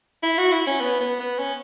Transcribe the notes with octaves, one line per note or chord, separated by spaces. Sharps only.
E4
F#4
E4
C#4
B3
B3
B3
C#4